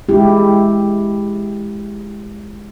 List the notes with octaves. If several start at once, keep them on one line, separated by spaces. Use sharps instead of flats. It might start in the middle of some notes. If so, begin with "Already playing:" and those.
G#3 E4 G4